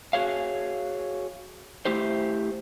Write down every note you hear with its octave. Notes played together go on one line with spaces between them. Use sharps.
F#4 G#4 C#5 F5
A3 E4 G4 C5